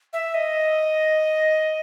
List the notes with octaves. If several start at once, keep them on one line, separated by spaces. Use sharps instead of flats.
E5
D#5